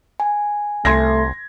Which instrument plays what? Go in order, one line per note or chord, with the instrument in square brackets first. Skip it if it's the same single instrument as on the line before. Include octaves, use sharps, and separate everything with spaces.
[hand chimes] G#5
[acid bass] C2 [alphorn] A3 [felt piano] C6 G#6 A#6